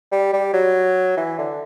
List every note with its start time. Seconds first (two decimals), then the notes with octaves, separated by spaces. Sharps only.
0.12 G3
0.33 G3
0.53 F#3
1.17 E3
1.38 D3